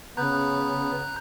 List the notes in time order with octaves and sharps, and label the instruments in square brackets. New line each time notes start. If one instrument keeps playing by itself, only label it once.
[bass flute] C#3 [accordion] B3 [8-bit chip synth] A#5 F#6 G6